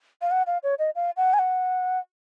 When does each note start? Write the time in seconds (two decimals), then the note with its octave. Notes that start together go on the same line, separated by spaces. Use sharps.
0.22 F5
0.31 F#5
0.47 F5
0.63 C#5
0.79 D#5
0.96 F5
1.17 F#5
1.34 G#5
1.39 F#5